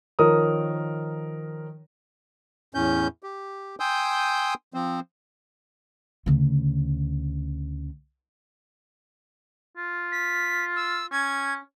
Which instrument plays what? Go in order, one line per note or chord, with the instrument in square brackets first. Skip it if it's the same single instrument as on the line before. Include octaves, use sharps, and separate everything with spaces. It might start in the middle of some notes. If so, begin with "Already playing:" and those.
[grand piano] D#3 F3 A#4 C#5 D#6
[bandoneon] E2 A2 C#4 G6
G4
G5 G#5 C6 D#6 E6 G6
F3 C4
[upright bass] D2 C#3
[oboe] F4
[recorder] B6
E6
[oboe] C#4 [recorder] G#6